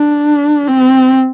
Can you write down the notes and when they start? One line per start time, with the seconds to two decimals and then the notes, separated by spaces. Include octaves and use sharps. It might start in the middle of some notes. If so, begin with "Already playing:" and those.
Already playing: D4
0.68 C4